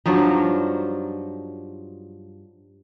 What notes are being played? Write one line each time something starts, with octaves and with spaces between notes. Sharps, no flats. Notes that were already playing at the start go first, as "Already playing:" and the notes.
G2 F3 F#3 D#4